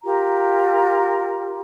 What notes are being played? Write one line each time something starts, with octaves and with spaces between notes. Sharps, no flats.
F4 G4 A#4 A#5